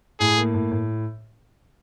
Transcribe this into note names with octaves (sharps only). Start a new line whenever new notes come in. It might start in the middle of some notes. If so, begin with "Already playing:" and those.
A2 G#4
A#3
A2
A2